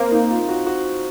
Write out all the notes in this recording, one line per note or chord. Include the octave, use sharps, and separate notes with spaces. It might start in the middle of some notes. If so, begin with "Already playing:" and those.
Already playing: A#3 C4
D#4
F4
F#4
F#4